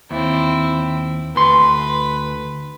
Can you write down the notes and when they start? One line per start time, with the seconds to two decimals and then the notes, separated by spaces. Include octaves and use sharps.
0.11 D#2 C4 E4
1.36 D2 B4 C6